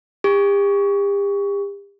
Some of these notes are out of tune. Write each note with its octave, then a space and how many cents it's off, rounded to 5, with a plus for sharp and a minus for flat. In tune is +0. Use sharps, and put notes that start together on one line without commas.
G4 +40